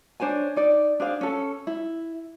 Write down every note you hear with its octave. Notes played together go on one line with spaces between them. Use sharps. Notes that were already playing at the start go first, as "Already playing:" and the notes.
D4 C5 C#5 G#5
D#4 D5
D4 G#4 C5 F5
C#4 A4
E4